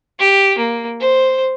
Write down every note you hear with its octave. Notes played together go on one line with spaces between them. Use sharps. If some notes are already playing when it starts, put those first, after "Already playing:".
G4
A#3
C5